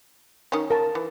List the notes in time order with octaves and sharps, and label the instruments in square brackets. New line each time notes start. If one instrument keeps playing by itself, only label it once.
[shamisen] D#3 C#4
[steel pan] A#4 A5
[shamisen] E3